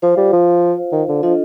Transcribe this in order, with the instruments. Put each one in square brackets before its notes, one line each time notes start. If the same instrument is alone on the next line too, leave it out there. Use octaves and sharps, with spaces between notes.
[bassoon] F3 [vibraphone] F4 C5 F5
[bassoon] G3
F3
D#3
D3
[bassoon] F3 [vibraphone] D4 F4 A4 D#5